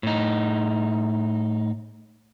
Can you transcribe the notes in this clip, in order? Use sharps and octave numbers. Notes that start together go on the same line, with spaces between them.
A2 D#4